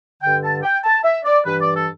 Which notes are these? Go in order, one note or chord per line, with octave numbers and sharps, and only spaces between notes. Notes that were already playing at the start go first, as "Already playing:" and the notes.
G2 D3 G5
A5
G5
A5
E5
D5
G2 E3 B4
D5
A4